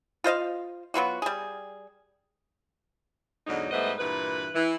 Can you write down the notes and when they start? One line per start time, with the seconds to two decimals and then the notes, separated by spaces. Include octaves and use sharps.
0.24 F4 C5 D#5 F5
0.94 F#3 B3 F4 F#4
1.22 G3 G#4
3.47 E2 G#2 D3 F#3 G#3 D#4
3.72 G#2 G3 A3 B3 C5 D#5
3.99 G2 A#2 E3 B4
4.55 E3